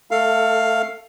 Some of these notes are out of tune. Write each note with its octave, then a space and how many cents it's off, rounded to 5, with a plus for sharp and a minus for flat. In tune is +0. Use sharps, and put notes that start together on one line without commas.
A3 +0 A4 +30 F5 +5